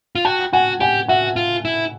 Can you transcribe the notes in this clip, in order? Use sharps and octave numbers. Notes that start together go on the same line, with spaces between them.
F4
F#4 G5 A5
F#4 F#5 G#5
G4 F#5 G#5
F#4 E5 F#5
F4
E4